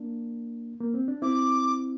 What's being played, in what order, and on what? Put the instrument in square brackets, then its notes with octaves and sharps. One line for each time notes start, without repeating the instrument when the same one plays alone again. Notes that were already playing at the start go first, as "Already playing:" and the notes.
Already playing: [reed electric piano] A#3 D4
A#3
C4
D4
[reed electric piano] C4 E4 [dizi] D6